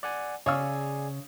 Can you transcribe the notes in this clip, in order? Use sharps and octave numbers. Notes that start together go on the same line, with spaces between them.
D5 F#5 G#5
C#3 G#4 C#5 D5 F5 G#5 E6